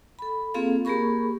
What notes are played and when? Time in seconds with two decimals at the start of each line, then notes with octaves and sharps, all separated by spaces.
0.19 A4 B5
0.54 A#3 C4 F4 G#4 A4 F5
0.85 A#3 G4 G#4 A#4 B5 C#6